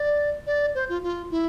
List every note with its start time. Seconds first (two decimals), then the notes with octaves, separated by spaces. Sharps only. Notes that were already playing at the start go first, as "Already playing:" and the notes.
Already playing: D5
0.47 D5
0.75 C5
0.89 F4
1.03 F4
1.31 E4